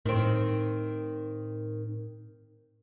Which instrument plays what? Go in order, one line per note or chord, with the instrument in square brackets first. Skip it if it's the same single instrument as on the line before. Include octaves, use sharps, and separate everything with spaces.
[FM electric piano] A2 [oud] D#3 C4